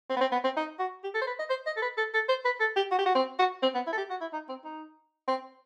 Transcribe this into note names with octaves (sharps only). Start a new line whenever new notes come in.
C4
B3
C4
B3
C4
D#4
F#4
G4
A4
C5
B4
D#5
C5
D#5
A4
B4
A4
A4
C5
B4
A4
G4
F#4
G4
F#4
C4
F#4
C4
B3
E4
A4
G4
F#4
E4
D#4
C4
D#4
C4